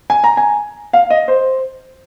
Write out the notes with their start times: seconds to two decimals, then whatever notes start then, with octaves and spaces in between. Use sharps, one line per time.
0.10 G#5
0.24 A#5
0.37 G#5
0.93 F5
1.10 D#5
1.28 C5